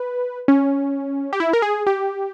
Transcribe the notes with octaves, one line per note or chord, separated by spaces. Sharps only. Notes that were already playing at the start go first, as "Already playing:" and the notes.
Already playing: B4
C#4
G4
E4
A#4
G#4
G4